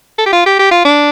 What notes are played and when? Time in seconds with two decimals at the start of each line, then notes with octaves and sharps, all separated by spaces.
0.18 A4
0.26 G4
0.33 F4
0.46 G4
0.59 G4
0.71 F4
0.85 D4